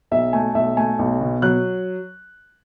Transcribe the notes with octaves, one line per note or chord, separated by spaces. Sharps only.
B1 E5
A3 G#5
B1 E5
A3 G#5
B1
B2
F#3 F#6